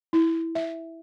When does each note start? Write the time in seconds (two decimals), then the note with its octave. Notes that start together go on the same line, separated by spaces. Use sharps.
0.13 E4
0.55 E5